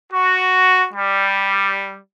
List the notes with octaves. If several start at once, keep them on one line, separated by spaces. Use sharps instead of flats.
F#4
G3